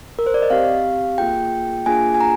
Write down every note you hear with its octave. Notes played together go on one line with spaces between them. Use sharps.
A#4
C5
D5
D#5
C4 G4 F5
A#3 F4 G#4 G5
A#3 D4 F4 G#4 G#5
G#5
A#5